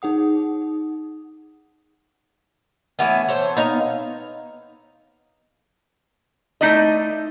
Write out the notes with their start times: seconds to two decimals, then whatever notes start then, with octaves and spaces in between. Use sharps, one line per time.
0.02 D#4 G#4 F#5 D#6
2.99 E3 A3 B3 C#4
3.28 A4 C5 C#5
3.57 B3 D#4 F5
6.61 A3 D#4 E4 D5 D#5